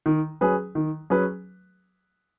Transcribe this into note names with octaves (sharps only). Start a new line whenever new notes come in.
D#3
F#3 C#4 G#4 B4
D#3
F#3 C#4 G#4 B4